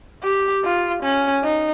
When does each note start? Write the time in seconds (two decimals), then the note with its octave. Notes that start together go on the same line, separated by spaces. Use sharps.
0.24 G4
0.64 F4
1.03 C#4
1.44 D#4